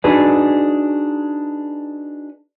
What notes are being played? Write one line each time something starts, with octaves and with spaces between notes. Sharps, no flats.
D4 D#4 F#4 G#4 B4 D5